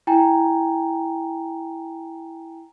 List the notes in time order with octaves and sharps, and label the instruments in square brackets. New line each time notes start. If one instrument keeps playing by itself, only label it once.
[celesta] E4 G5 G#5 A#5